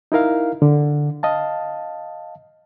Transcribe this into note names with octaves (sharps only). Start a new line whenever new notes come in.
D#4 E4 A#4 F5
D3
D#5 F5 A5